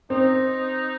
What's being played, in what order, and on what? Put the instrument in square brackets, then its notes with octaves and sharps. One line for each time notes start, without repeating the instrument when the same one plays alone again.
[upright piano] C4 [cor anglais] D#4